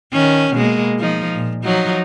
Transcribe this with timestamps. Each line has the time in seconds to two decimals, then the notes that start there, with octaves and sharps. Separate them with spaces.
0.13 D#3 C#4
0.54 B2 G#3 A#3
0.99 F3 D#4
1.34 A#2
1.64 F3 F#3 D#4